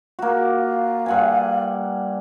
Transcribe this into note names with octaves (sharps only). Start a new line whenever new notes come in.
A#3 F#4
F5
G2 F#5 G#5